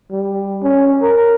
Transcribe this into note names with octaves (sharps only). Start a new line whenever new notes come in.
G3
C#4
A#4